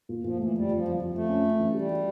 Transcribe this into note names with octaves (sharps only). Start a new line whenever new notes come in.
A#2
A#2 F3
E3 A3
F2 G3
F2 F3
F2
F2
F2 A3
C#4
C#4
E3
G3 G4
G4